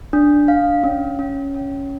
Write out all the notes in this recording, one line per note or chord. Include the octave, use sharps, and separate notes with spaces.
D4
F5
C#4
C#4
C#4